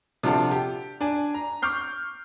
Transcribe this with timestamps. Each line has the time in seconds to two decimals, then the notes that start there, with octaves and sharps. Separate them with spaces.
0.23 C3 F3 D4 F4 F#4 A4
0.52 G4
1.01 D4 G#5
1.34 A#5
1.62 C#6 D6 F6 G6 C7